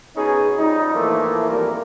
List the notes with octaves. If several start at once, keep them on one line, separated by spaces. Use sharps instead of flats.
B2 B3 C#4 D#4 G#4
F3 G3 D#4
A2 E3 F3 A3 A#3
G#1 E2 G3 A#3 A#4